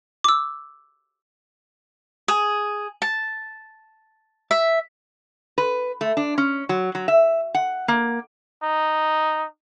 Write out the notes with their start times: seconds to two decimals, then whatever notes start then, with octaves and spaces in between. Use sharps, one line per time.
0.24 D6 E6
2.28 G#4
3.02 A5
4.51 E5
5.58 B4
6.01 A3
6.17 D4
6.38 C#4
6.69 F#3
6.95 F#3
7.08 E5
7.54 F#5
7.88 A#3
8.63 D#4